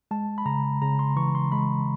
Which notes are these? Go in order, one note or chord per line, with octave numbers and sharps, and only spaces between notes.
G#3 A5
B5
C#3 A#5
C#3 A#5
C6
E3 C#6
C6
G#3 B5